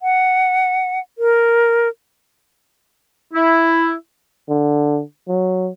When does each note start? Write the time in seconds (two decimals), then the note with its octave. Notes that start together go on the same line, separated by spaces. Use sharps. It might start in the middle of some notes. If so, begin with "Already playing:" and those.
0.01 F#5
1.18 A#4
3.34 E4
4.49 D3
5.28 F#3